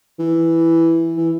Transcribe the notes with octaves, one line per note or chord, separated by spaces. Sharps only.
E3
E3